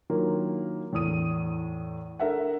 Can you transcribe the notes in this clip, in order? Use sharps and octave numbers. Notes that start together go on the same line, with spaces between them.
D#3 F#3 A#3 D4 F4
E2 A2 D#6 D#7
D4 A4 A#4 E5 F#5